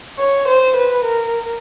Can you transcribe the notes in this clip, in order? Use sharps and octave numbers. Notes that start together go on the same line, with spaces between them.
C#5
C5
B4
A#4